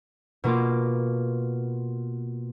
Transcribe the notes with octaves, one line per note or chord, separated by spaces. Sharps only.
B2 A#3 F4 D6